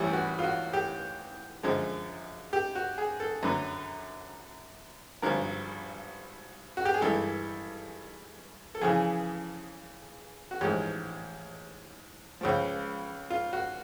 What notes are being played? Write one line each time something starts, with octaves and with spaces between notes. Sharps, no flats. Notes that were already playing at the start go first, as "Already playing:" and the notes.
Already playing: A1 A2 E3 G3 E4
F#4
F4
F#4
G4
F#2 D3 F3 G#3
G4
F#4
G#4
A4
F#2 D3 F#3 B4
G#1 G2 D3 F3 A#4
F#4
G4
G#4
G2 E3 G#3 A4
A4
F2 C#3 E3 G#4
F#4
A1 G#2 F3 G#3 G4
C#2 C#3 F3
F4
F#4